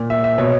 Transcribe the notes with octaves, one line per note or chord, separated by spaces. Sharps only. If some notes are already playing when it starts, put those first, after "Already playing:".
Already playing: A#2
E5
E5
B2 C#5